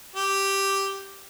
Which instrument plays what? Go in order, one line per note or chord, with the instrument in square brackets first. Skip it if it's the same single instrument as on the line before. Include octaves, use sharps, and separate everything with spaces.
[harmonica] G4